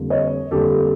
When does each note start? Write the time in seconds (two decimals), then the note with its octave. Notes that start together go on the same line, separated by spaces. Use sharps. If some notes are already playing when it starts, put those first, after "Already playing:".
Already playing: F2 D3 G3 A#3
0.10 C#5 D#5
0.51 F2 D3 G3 A#3 G4 A4